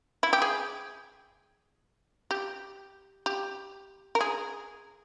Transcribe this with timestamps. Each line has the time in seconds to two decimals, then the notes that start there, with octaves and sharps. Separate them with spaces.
0.23 E4
0.33 G4
0.42 G#4
2.31 G4
3.26 G4
4.15 A#4
4.21 G#4